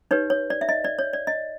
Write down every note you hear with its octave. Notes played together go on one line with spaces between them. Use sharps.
D#4 G4 B4 C#5
C#5
D5
E5
D#5
D5
C#5
D5
D#5